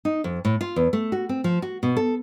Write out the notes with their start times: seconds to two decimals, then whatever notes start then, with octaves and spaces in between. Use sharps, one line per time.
0.05 D#4
0.24 F2
0.45 A2
0.61 F4
0.76 E2
0.93 A3
1.12 F#4
1.29 C4
1.44 F3
1.62 F#4
1.83 B2
1.97 A4